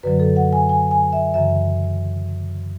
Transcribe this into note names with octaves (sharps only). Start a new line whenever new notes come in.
F#2 D3 F#3 B4
A4
F#5
G#5
G#5
G#5
E5
F#2 C#3 E3 E5